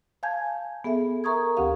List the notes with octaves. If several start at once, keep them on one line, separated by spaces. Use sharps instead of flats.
F5 G#5 A5 G6 G#6
B3 G#4 A4 E5
A#4 E5 A#5 C#6 D#6 G#6
D2 E3 C4 G4 F5